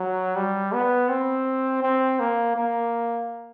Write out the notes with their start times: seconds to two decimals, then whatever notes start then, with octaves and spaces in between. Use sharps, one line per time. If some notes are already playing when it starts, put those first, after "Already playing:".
Already playing: F#3
0.36 G3
0.73 B3
1.09 C4
1.83 C4
2.20 A#3
2.56 A#3